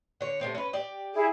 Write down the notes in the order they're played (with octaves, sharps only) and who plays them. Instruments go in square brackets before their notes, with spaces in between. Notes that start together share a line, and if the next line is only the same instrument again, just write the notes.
[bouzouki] D3 C#5
C3 A3 C4
C#4 B4
G4 D5
[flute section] E4 G#4